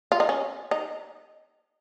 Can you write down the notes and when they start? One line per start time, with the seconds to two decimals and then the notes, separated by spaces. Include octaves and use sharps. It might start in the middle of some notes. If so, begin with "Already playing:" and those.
0.12 F4
0.20 D#4
0.29 C#4
0.71 D#4